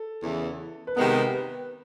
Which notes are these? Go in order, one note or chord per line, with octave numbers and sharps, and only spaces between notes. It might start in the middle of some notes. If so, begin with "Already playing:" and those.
Already playing: A4
E2 C#3 E3
B4
C3 D#3 G#3 B3 A#4
B4